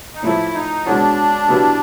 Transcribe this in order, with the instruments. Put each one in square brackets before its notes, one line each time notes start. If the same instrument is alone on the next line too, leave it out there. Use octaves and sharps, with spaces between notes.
[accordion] D#4
[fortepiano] A2 F3 A3 [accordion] E4
[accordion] D#4
[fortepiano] B2 G#3 C#4 F#4 [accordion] D4
[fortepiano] B2 F#3 B3 E4 G4